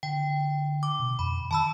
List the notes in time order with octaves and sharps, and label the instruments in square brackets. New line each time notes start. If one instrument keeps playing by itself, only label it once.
[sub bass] D3 [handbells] G5
[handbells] D6
[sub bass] B2
[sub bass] F2 [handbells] B5
[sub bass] D#3 [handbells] A5 B5 E6